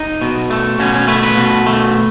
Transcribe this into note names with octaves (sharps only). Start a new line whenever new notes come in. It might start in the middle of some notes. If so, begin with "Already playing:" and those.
Already playing: D#4
B2
A3
B2 C#4
C#4
A3 B4
B4
B2
A3